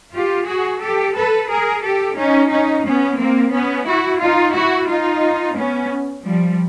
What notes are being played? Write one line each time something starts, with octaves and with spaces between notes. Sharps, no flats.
F4 G4
F#4 G#4
G4 A4
A4 B4
G#4 A#4
G4 A4
C#4 D#4
C#4 D#4
B3 C#4
A#3 C4
B3 C#4
E4 F#4
D#4 F4
E4 F#4
D#4 F4
B3 C#4
F3 G3